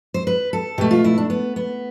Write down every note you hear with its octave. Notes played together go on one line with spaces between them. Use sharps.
C5
B4
A4
B2 A3 G4
F4
E4
D4
B3
B3